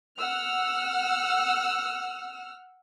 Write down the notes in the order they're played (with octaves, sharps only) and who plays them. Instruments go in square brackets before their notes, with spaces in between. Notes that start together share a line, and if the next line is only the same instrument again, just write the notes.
[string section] F#5 E6 F6